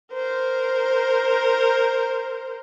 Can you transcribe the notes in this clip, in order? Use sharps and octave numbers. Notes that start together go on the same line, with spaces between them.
A#4 C5